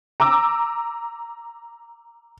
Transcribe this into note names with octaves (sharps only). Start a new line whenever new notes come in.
A#5 D6 E6